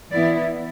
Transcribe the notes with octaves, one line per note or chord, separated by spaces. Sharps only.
E3 B3 E4 D5